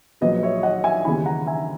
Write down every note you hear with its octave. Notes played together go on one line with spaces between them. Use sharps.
A#1 A#2 F#3 B4 D#5
C#5 E5
D#5 F#5
E5 G#5
D#2 C#3 E3 G#5 B5
F#5 A#5
E5 G#5